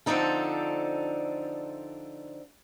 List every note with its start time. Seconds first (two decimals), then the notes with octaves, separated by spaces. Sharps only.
0.06 D3 F3 C4 D4 D#4 A4